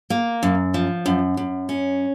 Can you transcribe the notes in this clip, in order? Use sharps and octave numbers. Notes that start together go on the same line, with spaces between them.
A#3
F#2
F3
F#2
F#2
C#4